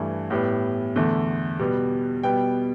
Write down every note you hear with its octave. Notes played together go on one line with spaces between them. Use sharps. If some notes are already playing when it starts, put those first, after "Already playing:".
Already playing: G2 E3 A3
A2 G3 B3
E2 D3 A3
B2 G3 B3
B2 G3 B3 G5